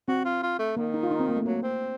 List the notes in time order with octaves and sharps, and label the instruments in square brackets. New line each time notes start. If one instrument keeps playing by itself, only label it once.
[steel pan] C4 [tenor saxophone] F#4
[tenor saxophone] F4
F4
A3
[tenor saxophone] D#3 [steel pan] A#3
[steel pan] D#4
F4
D#4
C4
A#3
A3
[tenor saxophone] F#3 [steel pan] A#3
[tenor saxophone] C4